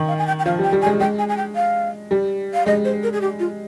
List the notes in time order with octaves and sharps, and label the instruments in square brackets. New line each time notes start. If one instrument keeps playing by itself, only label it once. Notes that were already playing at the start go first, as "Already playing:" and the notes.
Already playing: [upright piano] D#3
[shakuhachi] F5
G#5
G5
G5
[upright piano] F3 [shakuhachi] F5
[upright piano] G3
[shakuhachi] G5
[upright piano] G3
[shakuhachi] G#5
[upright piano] G#3
[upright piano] G#3 [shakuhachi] G5
[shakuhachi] G#5
G#5
G5
F5
[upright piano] G3
[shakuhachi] F5
[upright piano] G#3 [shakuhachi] D#5
[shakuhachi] C5
A#4
G#4
G4
F4